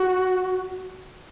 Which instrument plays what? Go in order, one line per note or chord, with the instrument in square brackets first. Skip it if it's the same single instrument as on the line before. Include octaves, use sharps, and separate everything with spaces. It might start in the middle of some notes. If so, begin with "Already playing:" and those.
Already playing: [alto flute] F#4